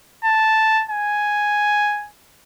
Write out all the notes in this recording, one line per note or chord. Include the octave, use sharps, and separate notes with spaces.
A5
G#5